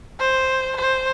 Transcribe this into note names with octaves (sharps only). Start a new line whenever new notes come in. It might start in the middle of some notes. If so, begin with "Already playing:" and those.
C5
C5